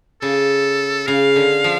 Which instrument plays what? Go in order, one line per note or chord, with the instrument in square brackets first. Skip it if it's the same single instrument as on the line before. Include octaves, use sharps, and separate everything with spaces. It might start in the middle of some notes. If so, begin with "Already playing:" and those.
[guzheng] C#3 [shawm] A4
[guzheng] C#3 [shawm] F5
[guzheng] D3
F3